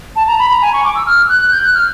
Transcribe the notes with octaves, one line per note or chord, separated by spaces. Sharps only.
A5
A#5
B5
A#5
G#5
C#6
D6
E6
F6
F#6
G6
F#6
F6